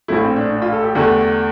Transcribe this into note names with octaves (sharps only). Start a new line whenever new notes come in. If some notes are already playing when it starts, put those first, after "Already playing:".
A#1 A2 F3 A3 E4
C4
D4
D4
F4
A4
G4
E2 D3 A3